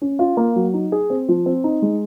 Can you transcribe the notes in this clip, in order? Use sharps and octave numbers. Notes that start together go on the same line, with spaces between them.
C#4
F4
A#3
F#3
D#4
G#4
C4
F3
C4
D#4
G#3